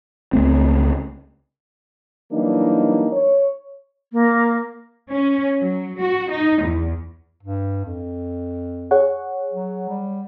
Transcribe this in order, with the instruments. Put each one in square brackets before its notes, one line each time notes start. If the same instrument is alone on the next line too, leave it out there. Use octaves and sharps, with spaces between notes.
[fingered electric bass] C#2 A3 C4
[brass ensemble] E3 F#3 G3 A#3 D4 D#4
C#5
[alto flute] A#3
[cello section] C#4
F#3
F#4
D#4
E2
[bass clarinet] G2
F2
[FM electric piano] G#4 C#5 F#5
[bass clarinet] F#3
G3